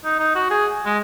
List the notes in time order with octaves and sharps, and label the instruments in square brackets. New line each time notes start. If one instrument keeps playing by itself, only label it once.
[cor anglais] D#4
D#4
F#4
G#4
G#3